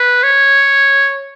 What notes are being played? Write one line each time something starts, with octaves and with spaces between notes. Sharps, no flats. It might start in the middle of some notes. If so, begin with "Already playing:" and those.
Already playing: B4
C#5